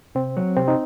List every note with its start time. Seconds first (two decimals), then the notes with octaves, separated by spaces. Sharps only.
0.15 C3 C4
0.37 F#3
0.57 C3 C4
0.68 D#4